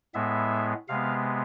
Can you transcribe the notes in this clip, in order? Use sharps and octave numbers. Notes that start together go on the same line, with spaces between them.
A2 G#3 B3 E5
C3 G#3 B3 F5